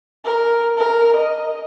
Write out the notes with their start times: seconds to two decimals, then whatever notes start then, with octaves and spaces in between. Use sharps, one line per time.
0.25 A#4
0.77 A#4
1.17 D#5